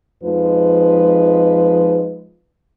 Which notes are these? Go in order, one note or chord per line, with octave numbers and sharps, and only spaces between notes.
F2 F3 G#3 D#4 B4